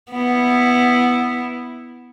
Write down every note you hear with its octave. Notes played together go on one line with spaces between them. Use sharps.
B3 E4